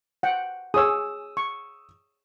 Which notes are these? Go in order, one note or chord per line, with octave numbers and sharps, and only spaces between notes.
F#5 G5
G#4 C#5 D#6 E6
C#6